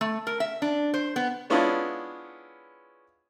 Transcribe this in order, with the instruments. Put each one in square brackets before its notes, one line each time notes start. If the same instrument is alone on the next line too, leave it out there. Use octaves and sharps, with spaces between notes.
[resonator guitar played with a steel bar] A3
A#4
E5
D4
C5
B3
[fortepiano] G#3 B3 C#4 D4 E4 F4